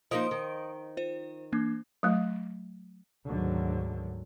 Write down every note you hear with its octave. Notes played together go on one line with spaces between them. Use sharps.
F3 A#3 D#4 D#5 D#6 D7
D#3
F4 C5
E3 A#3 D4
F#3 A3
D2 G#2 D3 D#3 F#3